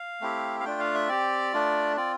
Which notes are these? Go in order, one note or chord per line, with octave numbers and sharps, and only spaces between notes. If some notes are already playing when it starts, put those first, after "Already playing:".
Already playing: F5
A3 C4 E4 G4
F5
A3 D4 F4 G5
F5
E5
C4 G4 D5
A3 D4 F4
C4 F4 D5